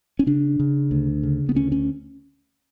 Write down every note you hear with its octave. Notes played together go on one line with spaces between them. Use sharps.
C#4
C#3 D4
C#3
D2
C#3
B3
D2 C#4
C#4